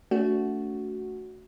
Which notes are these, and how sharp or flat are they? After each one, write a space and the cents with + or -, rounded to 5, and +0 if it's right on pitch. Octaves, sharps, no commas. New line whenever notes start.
A3 +0 D4 -45 F#4 +0